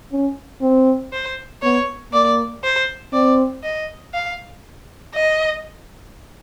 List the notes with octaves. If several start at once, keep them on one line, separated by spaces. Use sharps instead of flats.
C#4
C4
C5
B3 C#5
A#3 D5
C5
C4 D5
D#5
F5
D#5